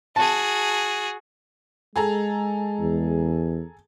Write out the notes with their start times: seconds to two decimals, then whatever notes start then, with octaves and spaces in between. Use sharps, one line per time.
0.16 F#4 G#4 A5
1.96 G#3 G#4 A4 A#5
2.80 E2